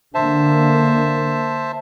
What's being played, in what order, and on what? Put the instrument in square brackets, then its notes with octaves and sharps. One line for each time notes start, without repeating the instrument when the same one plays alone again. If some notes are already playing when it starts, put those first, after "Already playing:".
[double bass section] D3 A#3 [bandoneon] C5 E5 A5